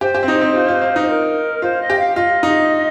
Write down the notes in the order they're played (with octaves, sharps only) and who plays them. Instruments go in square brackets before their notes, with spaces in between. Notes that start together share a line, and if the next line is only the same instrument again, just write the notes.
[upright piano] G4 [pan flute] C5
[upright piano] G4
C4
D#4
C4
F4
F4
F4
D#4
[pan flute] C5
A#4
[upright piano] F4 [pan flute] C5
[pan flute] D#5
[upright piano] G4
[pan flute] F5
[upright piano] F4 [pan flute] D#5
[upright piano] D#4